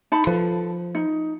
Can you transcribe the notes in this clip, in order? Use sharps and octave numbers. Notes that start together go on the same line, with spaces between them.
D#4 A5 B5
F3 A4 B4
D#4